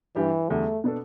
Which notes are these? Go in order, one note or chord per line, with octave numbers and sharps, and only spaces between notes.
G2 E3 G3 D4 G4
E2 D3 G3 A3
B2 B3 D4 A4